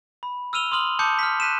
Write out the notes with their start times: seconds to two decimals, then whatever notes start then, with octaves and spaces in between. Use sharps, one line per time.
0.23 B5
0.53 E6 F6 D#7 F7 G7
0.72 C6 D#6 F6 F#7
0.99 A5 D6 D#6 G6 C#7
1.19 F6 B6
1.40 F#6 B6 D#7 E7